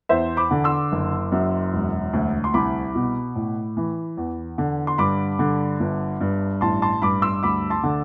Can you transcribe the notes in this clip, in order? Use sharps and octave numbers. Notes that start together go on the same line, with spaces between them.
E2 C5 E5
B5 D6
D3
C6 E6
F#1
F#2
E1
D2
C6
C2 B5 D6
B2
A2
E3
E2
D3
C6
G2 B5 D6
D3
G1
G2
A1 A5 C6
A5 C6
G2 B5 D6
C6 E6
D2 B5 D6
A5 C6
D3